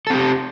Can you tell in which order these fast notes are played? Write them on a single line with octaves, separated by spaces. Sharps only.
A4 C4 G4